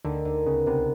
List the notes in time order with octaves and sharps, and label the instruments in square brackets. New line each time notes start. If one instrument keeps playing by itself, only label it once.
[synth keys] D2 D3 [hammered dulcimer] D#3
[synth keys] D2 D3 [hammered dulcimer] D#3
[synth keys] C#2 C#3 [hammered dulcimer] B3
[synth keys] C2 C3 [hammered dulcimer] B3